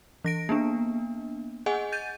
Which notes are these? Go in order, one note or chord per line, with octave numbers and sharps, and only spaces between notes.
E3 A#6 D7
A#3 B3 D4
G#4 D#5 F#5 G#5
G6 A6 D#7